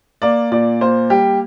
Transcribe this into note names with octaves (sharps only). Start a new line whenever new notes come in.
A#3 D5
A#2 D5
A#3 C5
G3 G4